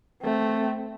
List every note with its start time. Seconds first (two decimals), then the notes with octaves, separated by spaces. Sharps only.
0.22 A3 C4